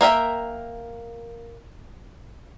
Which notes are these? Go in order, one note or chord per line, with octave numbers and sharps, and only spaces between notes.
A#3 A#4 E5 G5